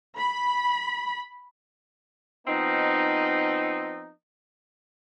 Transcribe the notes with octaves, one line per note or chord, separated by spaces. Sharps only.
B5
F3 B3 C4 D#4